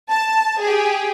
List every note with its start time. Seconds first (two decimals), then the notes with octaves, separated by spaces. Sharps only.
0.11 A5
0.62 G4 G#4